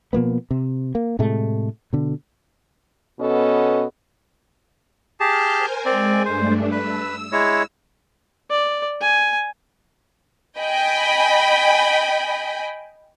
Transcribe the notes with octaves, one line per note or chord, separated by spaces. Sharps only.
B2 F3 A#3 B3
C3
A#3
A2 C3 G#3 A3
B2 D3
B2 B3 C#4 A4 D#5
G4 G#4 A5 F6 G6
A#4 C5 G#5
G#3 C4 D5 G#5
G2 A3 D4 C5
B4 E6
G#3 E4 C#5
D5
G#5
D#5 G5 G#5 B5